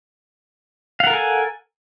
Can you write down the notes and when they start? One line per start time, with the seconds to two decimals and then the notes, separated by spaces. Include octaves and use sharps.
1.00 F5
1.03 F#5
1.07 A#4
1.10 A4
1.13 G#5